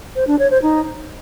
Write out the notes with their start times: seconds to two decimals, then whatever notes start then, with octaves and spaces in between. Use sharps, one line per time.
0.15 C5
0.27 D4
0.39 C#5
0.51 C5
0.62 D#4